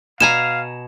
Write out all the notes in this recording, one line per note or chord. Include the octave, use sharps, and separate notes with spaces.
B2 F5 G#5 A#5 E7